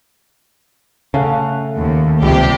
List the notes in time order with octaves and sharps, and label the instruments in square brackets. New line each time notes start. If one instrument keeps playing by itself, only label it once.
[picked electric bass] C#3 [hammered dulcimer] A3 F5 F#5
[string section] D#2
[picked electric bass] C#2 [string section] C3 G4 [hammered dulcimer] G3 E5